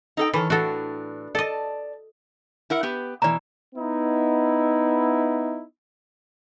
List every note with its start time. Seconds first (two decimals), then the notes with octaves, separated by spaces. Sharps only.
0.17 D#4 A4 G5
0.34 D#3 E3 A4 C#5
0.50 A2 E3 D4 F#4 A4
1.35 A4 D5 D#5 A5
2.70 E4 A#4 F#5
2.83 B3 G4 B4
3.22 B2 E3 D5 A#5
3.75 B3 D#4 E4